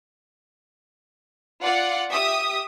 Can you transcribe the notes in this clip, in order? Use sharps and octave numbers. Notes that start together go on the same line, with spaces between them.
F4 D5 F#5
G4 E5 D#6